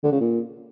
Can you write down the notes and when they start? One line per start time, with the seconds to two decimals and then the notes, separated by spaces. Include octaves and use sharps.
0.04 D3
0.12 C#3
0.20 A#2